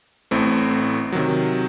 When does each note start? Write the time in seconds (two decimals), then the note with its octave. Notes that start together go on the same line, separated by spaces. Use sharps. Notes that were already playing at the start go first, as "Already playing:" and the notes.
0.31 A1 A2 A3 C4
1.12 C3 D#3 F#3